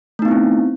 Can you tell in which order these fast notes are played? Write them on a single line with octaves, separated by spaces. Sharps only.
A3 D#4 B3 E4 C4